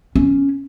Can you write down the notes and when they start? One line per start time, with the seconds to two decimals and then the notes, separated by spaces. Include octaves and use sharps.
0.15 C#4